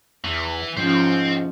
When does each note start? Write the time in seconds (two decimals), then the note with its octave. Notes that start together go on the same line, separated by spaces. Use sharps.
0.24 E2 E3
0.77 G#2 F3 C#4 C5 G5